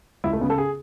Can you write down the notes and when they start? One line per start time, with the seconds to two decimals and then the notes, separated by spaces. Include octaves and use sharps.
0.24 C#2 E4
0.33 A3
0.41 C#3 B3
0.50 A4
0.58 G#4